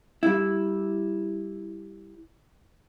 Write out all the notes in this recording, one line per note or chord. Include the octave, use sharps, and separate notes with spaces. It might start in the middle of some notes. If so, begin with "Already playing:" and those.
G3 E4